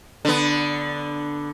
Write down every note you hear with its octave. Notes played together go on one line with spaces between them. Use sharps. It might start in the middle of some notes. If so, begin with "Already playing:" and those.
D3 B3